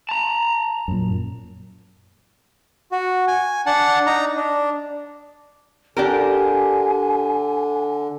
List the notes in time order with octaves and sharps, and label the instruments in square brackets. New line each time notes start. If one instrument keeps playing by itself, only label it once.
[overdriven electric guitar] A5 A#5
[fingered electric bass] F#2 A#2
[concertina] F#4
G#5
D4 F#5 A5
D#4 A#5
D4
[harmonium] D3 [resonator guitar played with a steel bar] D4 G4 A#4 [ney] G#5